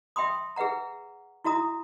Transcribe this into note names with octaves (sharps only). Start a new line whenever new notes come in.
E5 G5 B5 C6 D#6
G#4 B4 E5 F#5 A#5
E4 F#4 E5 A#5 D#6